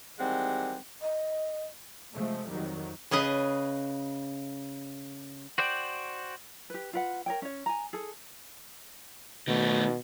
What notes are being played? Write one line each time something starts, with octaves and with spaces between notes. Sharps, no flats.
D#3 E3 G3 G#3 C4 F#5
D#5
C3 F3 G#3 A3
F2 D#3 F#3 G3
C#3 G#4 B4 D#5
F#4 C5 D5 G5
G4 B4
F4 B4 F#5
A#4 C#5 G5
C#4 C#5
G#5 A#5
G#4 A4
B2 D#3 A3